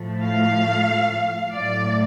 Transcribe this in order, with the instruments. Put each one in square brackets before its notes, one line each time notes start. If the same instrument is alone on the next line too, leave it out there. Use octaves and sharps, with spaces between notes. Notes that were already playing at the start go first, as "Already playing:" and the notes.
Already playing: [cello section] A2 F3 A3
F5
A2 F#3 A3 D5